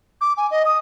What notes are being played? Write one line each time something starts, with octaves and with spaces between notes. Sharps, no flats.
D6
G#5
D#5
D#6